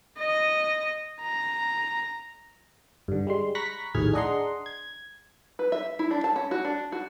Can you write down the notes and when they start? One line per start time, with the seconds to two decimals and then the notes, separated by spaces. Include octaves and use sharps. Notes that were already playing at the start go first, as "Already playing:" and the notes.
0.19 D#5
1.21 A#5
3.08 G2 D3
3.27 G3 G#3 C6
3.55 A#5 B5 C#6 F#6 A#6 B6
3.94 A#1 D#2 A2 G#4 F6 G#6
4.13 D4 G#4 D#5 F#5 A#5 C6
4.66 G#6
5.59 B4
5.72 E5
5.99 E4
6.11 D4
6.24 A5
6.36 C#4
6.51 F#4
6.65 D4
6.92 F#4